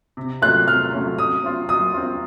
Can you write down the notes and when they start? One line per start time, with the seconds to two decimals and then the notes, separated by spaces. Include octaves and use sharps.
0.17 C3
0.42 F#3 A3 C#4 F4 F#6
0.67 C3 F6
0.93 F#3 A3 C#4 F4
1.18 F#3 D#6
1.44 C4 F4
1.69 F#3 D#6
1.94 C4 F4